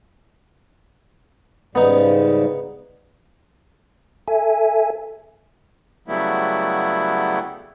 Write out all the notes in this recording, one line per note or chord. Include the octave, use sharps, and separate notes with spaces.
G#2 C#3 G3 B3 D#4
A4 E5 G#5
C#3 F#3 G3 A3 B3 E4